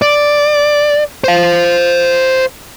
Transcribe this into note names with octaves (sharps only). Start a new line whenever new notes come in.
D5
C5 F5